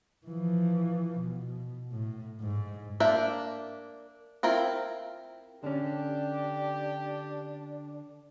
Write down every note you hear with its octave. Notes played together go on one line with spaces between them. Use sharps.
E3 F3
B2
A2
G#2
A#3 D4 C5 E5
C4 E4 F4 A#4
D3 C#4 D4 G4